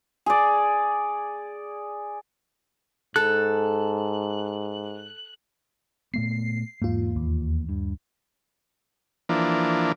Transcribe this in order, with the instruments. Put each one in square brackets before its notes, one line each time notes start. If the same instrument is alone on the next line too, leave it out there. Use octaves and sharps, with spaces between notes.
[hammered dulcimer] G#4 D5
[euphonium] G#2 [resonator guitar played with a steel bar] A4 [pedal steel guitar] F#6
[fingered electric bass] A#2 A3 B3 [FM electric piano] C7
[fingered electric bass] E2 A#3 [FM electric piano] G#2 F4
[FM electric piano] D#2
[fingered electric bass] G2
[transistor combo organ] E3 F3 A#3 D4